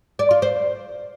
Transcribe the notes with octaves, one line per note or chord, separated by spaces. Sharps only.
D5
F4
C5